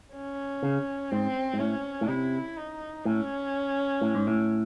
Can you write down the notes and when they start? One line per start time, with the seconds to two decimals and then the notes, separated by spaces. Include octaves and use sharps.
0.14 C#4
0.63 C#3
1.11 G#2 C4
1.53 G#2
1.59 A2 C#4
2.01 A2
2.08 C3 E4
2.57 D#4
3.05 A2 C#4
4.01 A2
4.15 G#2
4.27 A2